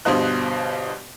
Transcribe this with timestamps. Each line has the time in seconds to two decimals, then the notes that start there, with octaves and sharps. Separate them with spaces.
0.05 G1 G2 B2 C5 D#5 F#6